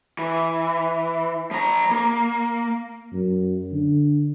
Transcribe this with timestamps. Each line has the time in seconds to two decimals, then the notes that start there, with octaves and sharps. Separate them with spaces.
0.19 E3
1.51 F3 A#5
1.91 A#3
3.13 F#2
3.73 D3